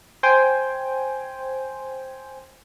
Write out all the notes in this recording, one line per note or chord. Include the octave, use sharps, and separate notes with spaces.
C5 G5 G#5